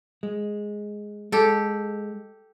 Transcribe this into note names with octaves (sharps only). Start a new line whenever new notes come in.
G#3
G#3 G4 A4